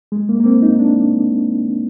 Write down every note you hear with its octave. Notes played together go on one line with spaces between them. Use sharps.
G#3
A#3
A#3
C4
D#4
D4